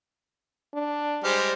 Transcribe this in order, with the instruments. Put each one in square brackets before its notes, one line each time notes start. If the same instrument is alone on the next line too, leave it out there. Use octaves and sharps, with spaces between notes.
[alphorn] D4
[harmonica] G3 G#3 F6 [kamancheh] C5 D5